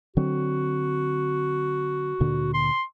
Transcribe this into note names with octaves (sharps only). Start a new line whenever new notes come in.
D3 F#3 C4 F#4
D2 A#2 D3
C6